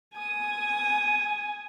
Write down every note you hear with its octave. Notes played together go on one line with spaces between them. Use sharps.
G#5 D#6